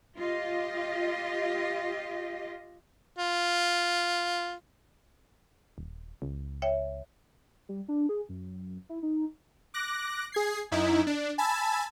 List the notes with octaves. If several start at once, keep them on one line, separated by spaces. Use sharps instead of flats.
F4 G4 D#5
F4
D#1
C#2
C#5 E5 G5
G3
D4
G#4
F#2
E4
D#4
D6 F#6 A#6
G#4 G#6 C7
F#2 D#4 E4
D4
G#5 A5 B5 E6